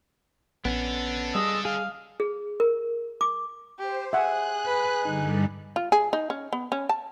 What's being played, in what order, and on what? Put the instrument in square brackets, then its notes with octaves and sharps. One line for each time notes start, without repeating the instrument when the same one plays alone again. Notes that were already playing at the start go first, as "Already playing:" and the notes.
[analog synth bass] A#1 [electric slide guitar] B3 C#4 [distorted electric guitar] D4 A4
[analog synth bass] G3 [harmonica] G#3 D#5 E6
[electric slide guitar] G#4 [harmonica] F5
[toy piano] G#4
A#4
D6
[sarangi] G4 [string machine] C5
[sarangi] G#4 [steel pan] E5 F#5 [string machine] F#6
[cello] B4
[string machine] G2 D3 G3 [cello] D#4
[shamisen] F4
G#4
D#4
C#4
B3
C#4
A5